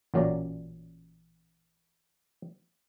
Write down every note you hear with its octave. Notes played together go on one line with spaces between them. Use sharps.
A1 A#2 F#3 C#4 D5 A#5